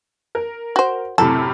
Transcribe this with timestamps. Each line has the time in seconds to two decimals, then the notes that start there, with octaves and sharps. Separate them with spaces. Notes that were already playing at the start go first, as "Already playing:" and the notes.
0.35 A#4
0.76 F#4 C5
1.18 F#2 A2 C3 A4